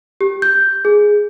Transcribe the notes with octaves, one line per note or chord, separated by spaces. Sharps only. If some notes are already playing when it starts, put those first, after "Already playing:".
G4
G6
G#4